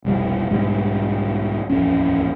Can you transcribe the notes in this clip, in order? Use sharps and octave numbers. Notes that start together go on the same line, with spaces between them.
F1 B1 G3
B1 G#2 G3
D#1 A1 F2 C#4